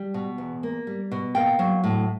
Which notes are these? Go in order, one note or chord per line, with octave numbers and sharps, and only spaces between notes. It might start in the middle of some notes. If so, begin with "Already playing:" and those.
Already playing: G3
B2
E2
A#3
G3
B2
A#3 G5
F#3
A2